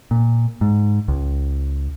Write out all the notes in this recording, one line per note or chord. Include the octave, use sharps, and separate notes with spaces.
A#2
G#2
C#2